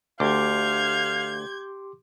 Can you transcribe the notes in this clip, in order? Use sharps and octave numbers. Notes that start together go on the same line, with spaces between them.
D2 G4 F5 C6 D6 G6 G#6